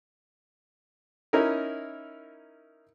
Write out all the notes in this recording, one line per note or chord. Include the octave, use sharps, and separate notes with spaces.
C#4 D#4 E4 A#4